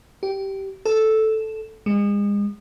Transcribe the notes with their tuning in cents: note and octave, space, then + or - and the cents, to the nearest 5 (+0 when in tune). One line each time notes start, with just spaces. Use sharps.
G4 -15
A4 -5
G#3 -35